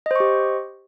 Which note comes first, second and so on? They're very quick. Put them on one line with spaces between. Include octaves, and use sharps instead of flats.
D#5 C5 C#6 G4